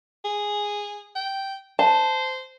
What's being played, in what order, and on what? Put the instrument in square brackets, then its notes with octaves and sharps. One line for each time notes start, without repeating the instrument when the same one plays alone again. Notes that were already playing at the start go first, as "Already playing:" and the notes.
[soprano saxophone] G#4
G5
[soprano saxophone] C5 [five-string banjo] A5